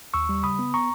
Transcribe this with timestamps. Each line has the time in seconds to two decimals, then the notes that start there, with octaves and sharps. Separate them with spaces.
0.14 D#2 C#6 E6
0.29 G3
0.43 C#3 B5 D#6
0.59 B3
0.74 A#5 C#6